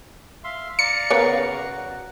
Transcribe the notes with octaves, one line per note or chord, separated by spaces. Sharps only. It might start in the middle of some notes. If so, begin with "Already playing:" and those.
E5 F5 C6
D5 F5 A#5 C#7
C#3 B3 A#4
F#4